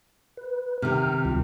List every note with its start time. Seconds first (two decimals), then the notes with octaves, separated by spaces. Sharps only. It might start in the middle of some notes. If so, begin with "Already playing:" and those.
0.37 B4
0.82 C3 D#3 G5 F6
1.25 D2 G3 F4